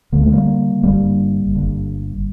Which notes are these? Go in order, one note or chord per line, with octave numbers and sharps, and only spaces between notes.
D2 D3 A#3
A3
G3 A#3
G1 G2 D3 G3 A#3
G1 G2 D3